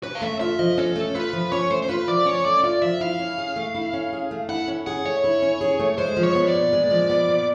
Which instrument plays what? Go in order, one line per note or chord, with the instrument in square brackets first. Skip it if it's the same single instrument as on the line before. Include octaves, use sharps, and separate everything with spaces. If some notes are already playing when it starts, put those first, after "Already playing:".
[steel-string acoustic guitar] C#4 [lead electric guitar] B4
[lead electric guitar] F5
[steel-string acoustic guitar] A3 [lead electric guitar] E5
[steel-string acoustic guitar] F4 [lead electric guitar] E5
[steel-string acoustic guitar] F3 [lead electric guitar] D#5
[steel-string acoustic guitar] C#4 [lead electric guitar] A4
[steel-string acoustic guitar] A3
[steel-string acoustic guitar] F4 [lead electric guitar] B4
[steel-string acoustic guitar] F3
[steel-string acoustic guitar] C#4 [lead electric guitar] C#5
[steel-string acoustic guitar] A3 [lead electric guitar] C5
[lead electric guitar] C5
[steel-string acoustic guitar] F4 [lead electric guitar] B4
[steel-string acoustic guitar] F3 [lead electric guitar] D5
[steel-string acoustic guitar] C#4 [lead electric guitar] C#5
[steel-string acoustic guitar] A3 [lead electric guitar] D5
[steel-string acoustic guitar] F4 [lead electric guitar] D5
[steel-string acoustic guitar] F3 [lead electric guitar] E5
[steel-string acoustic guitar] E4 [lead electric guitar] F5
[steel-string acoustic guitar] C#4
G#4
A3
E4
C#4
G#4
A3
[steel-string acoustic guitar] E4 [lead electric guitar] F#5
[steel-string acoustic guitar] C#4
[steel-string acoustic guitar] G#4 [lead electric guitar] F#5
[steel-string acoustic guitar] A3 [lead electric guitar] C#5
[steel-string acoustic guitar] E4
C#4
G#4
A3
[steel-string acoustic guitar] G#3 [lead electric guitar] C5
[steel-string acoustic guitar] F3
[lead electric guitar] C#5
[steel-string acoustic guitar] B3
[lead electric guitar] D5
[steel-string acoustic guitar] A#2
G#3
F3
B3
A#2